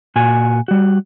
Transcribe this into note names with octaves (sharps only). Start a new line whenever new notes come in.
A#2 F#4 G#5
G3 F#4